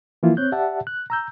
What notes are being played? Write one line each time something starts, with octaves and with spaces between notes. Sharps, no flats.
E3 F3 A#3 E4 F4
C4 C#5 F#6 G6
G4 D5 E5 F#5 A5
F#6
A#5 E6 G6